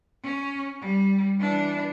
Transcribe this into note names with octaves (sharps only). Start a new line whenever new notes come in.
C#4
G3
E3 D4